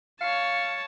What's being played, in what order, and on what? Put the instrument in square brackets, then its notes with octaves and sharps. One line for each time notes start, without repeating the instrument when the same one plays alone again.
[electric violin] C#5 A5 [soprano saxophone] F5 [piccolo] C#7